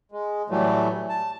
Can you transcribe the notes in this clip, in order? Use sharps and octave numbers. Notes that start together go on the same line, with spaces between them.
G#3
A2 E3 F#3 G3 A3
A5